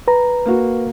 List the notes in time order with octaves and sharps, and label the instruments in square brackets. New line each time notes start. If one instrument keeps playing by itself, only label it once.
[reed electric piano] B4 A#5
[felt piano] A#3 F#4